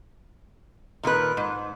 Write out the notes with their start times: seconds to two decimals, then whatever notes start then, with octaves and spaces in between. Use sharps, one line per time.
1.03 A#2 D#3 D#4 B4
1.37 G#2